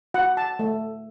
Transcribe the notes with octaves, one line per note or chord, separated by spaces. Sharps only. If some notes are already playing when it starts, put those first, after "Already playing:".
F#4 F#5
A5
A3